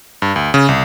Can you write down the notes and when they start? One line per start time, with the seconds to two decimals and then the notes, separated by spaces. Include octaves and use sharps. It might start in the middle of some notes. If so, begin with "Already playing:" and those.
0.22 G2
0.36 D2
0.54 C#3
0.69 C2